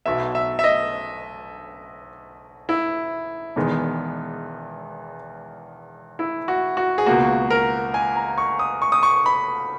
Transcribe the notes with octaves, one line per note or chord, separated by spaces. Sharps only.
B1 B2 F#3 B3 E5
E5
E5
D#5
E4
E1 E2 D#3 G#3 B3
E4
F#4
F#4
G#4
C#2 B2 A#3 F#4
A#4
G#5
A#5
C#6
D#6
C#6
D#6
C#6
B5